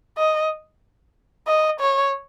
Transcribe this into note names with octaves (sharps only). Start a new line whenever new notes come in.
D#5
D#5
C#5